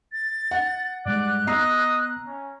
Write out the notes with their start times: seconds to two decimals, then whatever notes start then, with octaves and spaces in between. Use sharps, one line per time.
0.13 A6
0.51 F#5
1.06 G#2 G3 G#3 D5 F#6
1.47 B3 D#5 A#5 E6 C7
2.27 C#4